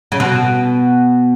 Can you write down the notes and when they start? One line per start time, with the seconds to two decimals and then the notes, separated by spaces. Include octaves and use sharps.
0.12 C#3
0.20 B2